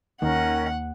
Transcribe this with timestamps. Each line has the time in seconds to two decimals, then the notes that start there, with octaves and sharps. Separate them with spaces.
0.22 D#2 D#3 A#3 C#4 A#4 F#5